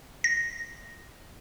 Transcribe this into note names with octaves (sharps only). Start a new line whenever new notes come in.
A#6